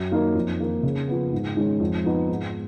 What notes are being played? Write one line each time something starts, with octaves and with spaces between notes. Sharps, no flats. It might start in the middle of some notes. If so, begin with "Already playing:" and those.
Already playing: F#2
D#3 A#3 D#4
F2
D#3 A#3
C#3
F3 B3
G#2
D#3 G#3 C#4
F2
F3 B3 D#4
G#2